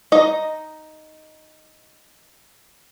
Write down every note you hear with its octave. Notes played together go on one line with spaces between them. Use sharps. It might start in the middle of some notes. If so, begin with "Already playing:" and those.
D#4 D#5